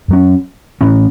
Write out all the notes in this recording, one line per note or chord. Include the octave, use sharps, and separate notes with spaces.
F#2 F#3 C#4
A2 E3 C#4